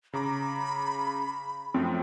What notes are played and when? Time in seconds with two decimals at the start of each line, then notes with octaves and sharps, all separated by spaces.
0.13 C#3 A#5 B5 D6
1.74 F#2 F3 A3 C4